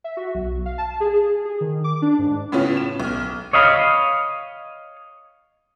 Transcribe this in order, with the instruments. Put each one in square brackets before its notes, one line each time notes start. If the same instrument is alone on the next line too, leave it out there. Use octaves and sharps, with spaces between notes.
[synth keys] E5
F#4
B1
F5
A5
G#4
G#4
D#3
D6
D4
G#2
[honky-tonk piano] A2 C#3 B3 C#4 F4
E7
B1 F6
[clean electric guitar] C#5 D#5 F5 B5